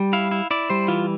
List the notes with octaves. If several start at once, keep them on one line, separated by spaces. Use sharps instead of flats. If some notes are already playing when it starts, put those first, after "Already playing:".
Already playing: G3
E4 F5
E4
E4 D5
G3 C5
E3 F4